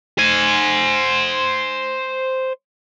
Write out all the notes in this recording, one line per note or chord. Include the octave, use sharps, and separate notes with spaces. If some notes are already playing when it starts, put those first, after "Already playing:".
C5 G#5